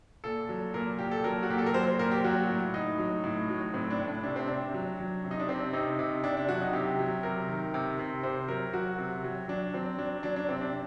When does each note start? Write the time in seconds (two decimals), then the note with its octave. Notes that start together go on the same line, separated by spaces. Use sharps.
0.24 A#2 A4
0.49 F#3
0.74 A#2 A#4
0.99 A#2 G4
1.11 A4
1.24 F#3 A#4
1.43 F#4
1.49 A#2 G4
1.58 A4
1.66 A#4
1.74 F#3 C5
1.87 C5
1.99 A#2 A#4
2.11 G4
2.24 F#3 F#4
2.49 A2
2.74 A2 D#4
2.99 F#3
3.24 A2
3.49 F#3
3.74 A2 C4
3.90 D4
3.99 A2
4.08 D4
4.23 C3 D4
4.36 C4
4.48 C3 D4
4.74 F#3
4.99 F#3
5.24 C3
5.31 D#4
5.40 D4
5.49 C3 C4
5.73 C3 D#4
5.99 C3
6.24 C3 D4
6.37 D4
6.49 F#3 F#4
6.62 D#4
6.73 C3 G4
6.99 F#3
7.23 C3 A#4
7.48 D#3
7.74 C3
7.99 C3
8.23 C3 C5
8.48 F#3 A#4
8.74 F#3 F#4
8.98 C3
9.24 F#3
9.48 F#3 D4
9.73 F#3 C4
9.98 F#3 D4
10.23 F#3 D4
10.36 D4
10.49 C3 C4
10.61 D4